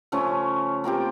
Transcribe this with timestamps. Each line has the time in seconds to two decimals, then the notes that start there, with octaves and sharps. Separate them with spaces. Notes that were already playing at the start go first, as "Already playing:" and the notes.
0.12 C#3 F3 A3 C#4
0.84 A#3 C4 F4 G4